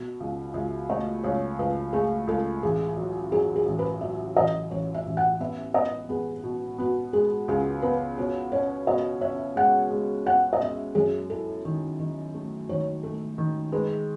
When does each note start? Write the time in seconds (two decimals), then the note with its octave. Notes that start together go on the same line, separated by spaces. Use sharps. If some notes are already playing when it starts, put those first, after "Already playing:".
Already playing: B2
0.20 C#2
0.54 C#2 E5
0.89 A3 D#5
1.23 C#2 C#5
1.59 C#2 B4
1.93 A3 G#4
2.27 C#2 A4
2.63 A1 G#4
2.97 F#3
3.32 F#3 G#4
3.56 G#4
3.66 A1
3.79 B4
4.01 F#3 E5
4.36 A1 D#5
4.70 A1 C#5
4.94 E5
5.06 A1
5.17 F#5
5.40 B3 E5
5.74 B3 D#5
6.09 B3 G#4
6.44 B2
6.78 B3 F#4
7.13 G#3 G#4
7.48 C#2 G#4
7.82 B3 B4
8.18 B2 C#5
8.52 C#4 C#5
8.87 B2 D#5
9.21 C#4 E5
9.56 G#3 F#5
9.91 G#3
10.26 C#4 F#5
10.53 D#5
10.60 B2 E5
10.95 F#2 G#4
11.30 E4 A4
11.65 D#3
12.00 D#3
12.34 A3
12.69 D#3 C#5
13.03 A3 A4
13.38 D#3
13.72 G#3 B4